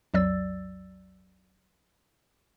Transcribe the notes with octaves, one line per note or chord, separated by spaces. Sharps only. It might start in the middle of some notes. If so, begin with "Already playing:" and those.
B1 F2 F#3 D5 E6 A6